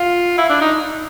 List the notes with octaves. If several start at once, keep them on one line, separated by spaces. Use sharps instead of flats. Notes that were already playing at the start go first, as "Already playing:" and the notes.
Already playing: F4
E4
D4
D#4